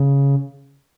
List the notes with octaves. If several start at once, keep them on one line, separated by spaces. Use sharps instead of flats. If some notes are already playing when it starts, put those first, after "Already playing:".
Already playing: C#3